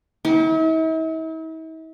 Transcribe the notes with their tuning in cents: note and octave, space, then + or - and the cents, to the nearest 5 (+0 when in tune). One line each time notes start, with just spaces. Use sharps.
E4 -45